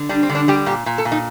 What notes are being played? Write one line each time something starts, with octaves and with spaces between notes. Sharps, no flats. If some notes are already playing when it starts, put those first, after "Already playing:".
Already playing: D3
G3 D4
C4
D3
D4
G3 G4
A#2 G4
A#2
A4
A#2
D#4